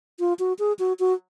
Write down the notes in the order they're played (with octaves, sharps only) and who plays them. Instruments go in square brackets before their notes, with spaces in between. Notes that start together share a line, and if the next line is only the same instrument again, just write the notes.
[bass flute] F4
F#4
G#4
F#4
F#4